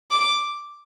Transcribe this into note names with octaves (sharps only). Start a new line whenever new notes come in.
D6